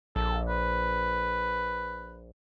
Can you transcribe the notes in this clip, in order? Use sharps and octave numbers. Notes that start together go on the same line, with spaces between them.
A#1 A4
B4